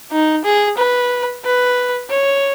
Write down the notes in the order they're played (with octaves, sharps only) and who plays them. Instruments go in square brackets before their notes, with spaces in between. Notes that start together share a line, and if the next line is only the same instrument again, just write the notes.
[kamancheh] D#4
G#4
B4
B4
C#5